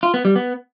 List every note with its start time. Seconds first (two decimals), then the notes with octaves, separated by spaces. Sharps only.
0.03 F4
0.14 B3
0.25 G3
0.36 B3